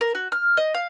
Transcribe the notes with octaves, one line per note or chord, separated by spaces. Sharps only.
A#4
F#4
F6
D#5
F5